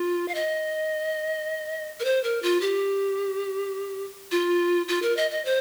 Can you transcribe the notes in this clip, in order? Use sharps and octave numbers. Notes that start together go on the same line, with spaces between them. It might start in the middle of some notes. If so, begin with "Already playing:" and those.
Already playing: F4
F5
D#5
A#4
C5
A#4
F4
G4
F4
F4
A#4
D#5
D#5
C5